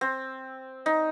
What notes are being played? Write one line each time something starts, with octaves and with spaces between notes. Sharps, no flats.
C4
D#4